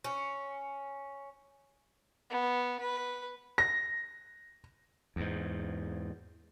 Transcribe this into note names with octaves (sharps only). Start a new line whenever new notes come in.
C#4
B3
B4
A#6
E2 G#2